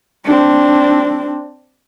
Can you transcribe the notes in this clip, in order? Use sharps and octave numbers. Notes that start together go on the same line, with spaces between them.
C4 D4